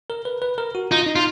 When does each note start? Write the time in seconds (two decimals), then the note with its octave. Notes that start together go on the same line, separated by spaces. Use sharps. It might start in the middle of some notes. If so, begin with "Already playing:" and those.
0.10 A#4
0.25 B4
0.42 B4
0.58 A#4
0.75 F#4
0.91 D#4 F4
1.06 D#4
1.16 F4